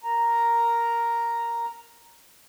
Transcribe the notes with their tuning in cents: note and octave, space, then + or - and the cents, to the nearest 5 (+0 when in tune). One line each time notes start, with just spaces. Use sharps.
A#4 +0 A#5 +0